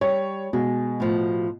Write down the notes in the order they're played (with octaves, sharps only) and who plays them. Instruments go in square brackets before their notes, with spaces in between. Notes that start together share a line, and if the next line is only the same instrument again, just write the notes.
[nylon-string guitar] G3 [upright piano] C#5
[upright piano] B2 [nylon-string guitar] G#3
[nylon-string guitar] A2 F3